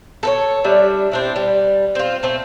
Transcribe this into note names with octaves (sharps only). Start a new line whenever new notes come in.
A4 B4 C#5
G3 D4 E5
C4 D4 E4
G3
C4 F4
A3 C4